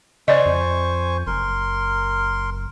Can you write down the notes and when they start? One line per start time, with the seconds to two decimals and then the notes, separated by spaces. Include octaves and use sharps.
0.28 C#3 C5 D5 D#5 G#5 C#6
0.46 F2
1.27 F#1 A#4 C6